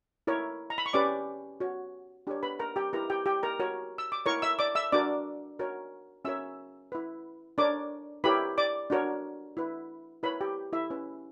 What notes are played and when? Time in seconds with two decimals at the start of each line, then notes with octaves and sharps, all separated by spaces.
0.27 E4 A#4 C#5
0.70 A#5
0.78 B5
0.86 C#6
0.93 C#4 G4 B4 D5 D6
1.60 F#4 C#5
2.27 D4 G4 A#4 C#5
2.43 B4 B5
2.59 A#4 A#5
2.76 G4 G5
2.93 E4 G4 A#4 B4 A#5
3.10 G4 G5
3.26 G4 G5
3.43 A#4 A#5
3.60 F#4 A#4 C#5
3.98 E6
4.12 D6
4.26 E4 A#4 C#5 C#6
4.42 E5 E6
4.59 D5 D6
4.75 E5 E6
4.92 D4 F#4 A#4 D5 D6
5.59 F#4 A#4 C#5
6.25 C#4 F#4 A#4 C#5 E5 E6
6.92 E4 B4
7.58 D4 A#4 C#5 D5 D6
8.24 E4 G4 A#4 B4 C#5 B5
8.58 D5 D6
8.90 D4 F#4 A#4 C#5
9.57 E4 B4
10.23 E4 A#4 B4 C#5 B5
10.41 G4 G5
10.73 E4 E5
10.90 C#4 E4 B4